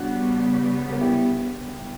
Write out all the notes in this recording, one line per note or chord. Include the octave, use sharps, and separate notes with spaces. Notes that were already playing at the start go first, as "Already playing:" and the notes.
Already playing: C#3 G3 B3 D4 F#4
A#4
E4 G4